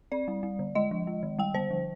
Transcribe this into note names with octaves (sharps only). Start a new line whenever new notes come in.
C4 D5
G3
G3
D3
G#3 D#5
F3
G#3
D#3
G3 G5
D3 C5
F3